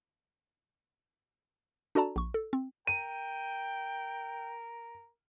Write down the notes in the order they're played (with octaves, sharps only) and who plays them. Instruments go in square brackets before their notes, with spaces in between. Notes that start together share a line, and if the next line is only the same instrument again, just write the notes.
[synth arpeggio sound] D4 F#4 A4 D5 A5 A#5
A#1 C#6
A4
C4
[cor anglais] A#4 [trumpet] G5 [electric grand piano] D#7